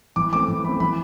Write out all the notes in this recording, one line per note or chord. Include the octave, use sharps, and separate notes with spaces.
E3 D6
A3 C4 D6
E3
A3 C4 B5
E3 B5